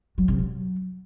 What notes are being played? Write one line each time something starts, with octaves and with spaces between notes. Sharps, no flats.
F#3
C3
F#3